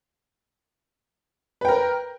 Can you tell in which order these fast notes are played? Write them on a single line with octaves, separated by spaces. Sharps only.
B4 G5 A#4